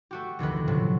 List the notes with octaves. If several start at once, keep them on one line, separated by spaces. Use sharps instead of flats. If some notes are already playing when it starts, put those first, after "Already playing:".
A3 F#4 G4
F1 D2 D#3 B4
A2 C3 F3 F#3